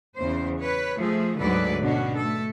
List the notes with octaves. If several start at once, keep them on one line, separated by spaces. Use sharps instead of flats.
E2 C#3 C5
B4 C#5
F3 A3 G#4
D2 G#2 D3 F#3 B4 D5
B2 C#4 D4 F#4
A3 A4